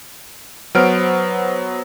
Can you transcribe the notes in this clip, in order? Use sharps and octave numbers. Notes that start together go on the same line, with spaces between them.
F#3 B3 C5 F6 D7